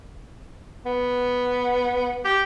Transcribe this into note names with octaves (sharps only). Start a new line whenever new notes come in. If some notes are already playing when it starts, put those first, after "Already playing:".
B3
G4